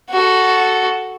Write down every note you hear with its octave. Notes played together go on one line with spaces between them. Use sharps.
F#4 A4